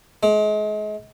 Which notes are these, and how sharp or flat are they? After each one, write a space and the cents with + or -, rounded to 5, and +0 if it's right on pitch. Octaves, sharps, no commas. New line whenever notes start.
G#3 +35